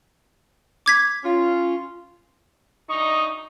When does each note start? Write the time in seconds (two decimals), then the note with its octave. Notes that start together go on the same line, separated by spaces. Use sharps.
0.86 D6 G#6 B6
1.24 C#4 F4
2.90 D2 D#4 C#6 D#6